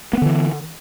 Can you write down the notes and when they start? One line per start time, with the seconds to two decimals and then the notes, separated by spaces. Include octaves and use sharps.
0.13 A#3
0.17 B3
0.22 D3
0.26 E3